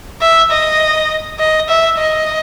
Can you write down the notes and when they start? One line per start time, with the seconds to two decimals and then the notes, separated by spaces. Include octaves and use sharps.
0.21 E5
0.51 D#5
1.39 D#5
1.68 E5
1.98 D#5